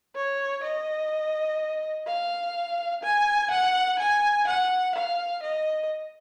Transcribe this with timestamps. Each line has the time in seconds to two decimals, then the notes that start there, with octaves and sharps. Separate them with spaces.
0.15 C#5
0.63 D#5
2.07 F5
3.03 G#5
3.51 F#5
3.99 G#5
4.47 F#5
4.95 F5
5.43 D#5